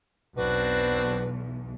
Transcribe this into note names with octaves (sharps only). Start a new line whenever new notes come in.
B1 E2 C4 D4 F#4 B4